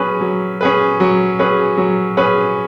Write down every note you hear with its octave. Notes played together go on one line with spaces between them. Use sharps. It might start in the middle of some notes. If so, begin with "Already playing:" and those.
Already playing: F#3 C#4 G#4 B4
F#3
C#4 G#4 B4
F#3
C#4 G#4 B4
F#3
C#4 G#4 B4